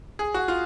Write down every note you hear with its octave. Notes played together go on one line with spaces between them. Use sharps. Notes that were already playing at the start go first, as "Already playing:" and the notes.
G#4
F#4
F4